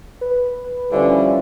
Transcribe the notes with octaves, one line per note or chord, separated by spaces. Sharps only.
B4
D3 E3 F3 G3 C#4